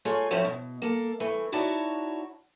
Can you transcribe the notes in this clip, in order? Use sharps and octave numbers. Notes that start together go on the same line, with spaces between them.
A3 F4 G#4 C#5 D#5
F3 A3 C4 C#4 E4
B2
A#3 A4
E3 A3
D#4 E4 F#4 C#5 D5 A5